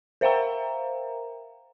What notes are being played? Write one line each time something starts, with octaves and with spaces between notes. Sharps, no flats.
A#4 C5 E5 F5 G5 A#5